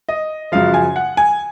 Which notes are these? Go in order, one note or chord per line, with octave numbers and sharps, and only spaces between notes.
D#5
F#2 C#3 F3 F5
G#5
F#5
G#5